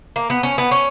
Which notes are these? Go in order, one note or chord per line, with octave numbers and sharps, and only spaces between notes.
A#3
B3
C#4
B3
C#4